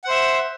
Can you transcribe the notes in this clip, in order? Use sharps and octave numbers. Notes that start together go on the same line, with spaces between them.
C5 E5 F#5